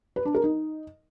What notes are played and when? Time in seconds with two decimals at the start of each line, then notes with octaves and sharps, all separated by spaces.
0.16 B4
0.25 D4
0.35 A#4
0.44 D#4